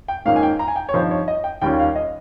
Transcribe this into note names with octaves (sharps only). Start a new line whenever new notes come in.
G5
G#2 D#3 A#3 C#4 F4 F5
G#5
G5
A#5
G#5
G5
C#5
G2 F3 C4 D#4 C5
C#5
D#5
G5
D#2 D#3 G3 C#4 F4 G5
F5
D#5